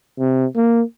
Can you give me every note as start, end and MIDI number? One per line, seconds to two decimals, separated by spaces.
0.19 0.46 48
0.56 0.82 58